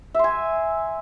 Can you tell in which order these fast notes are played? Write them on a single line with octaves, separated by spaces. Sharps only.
E5 C6 G#5